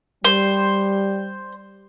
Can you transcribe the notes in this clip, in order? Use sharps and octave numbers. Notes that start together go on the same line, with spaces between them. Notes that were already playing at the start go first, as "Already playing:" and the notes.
G3 C5